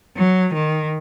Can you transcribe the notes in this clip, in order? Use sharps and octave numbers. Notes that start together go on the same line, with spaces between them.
F#3
D#3